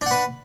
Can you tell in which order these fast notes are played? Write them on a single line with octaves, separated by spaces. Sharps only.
D4 F#5 B4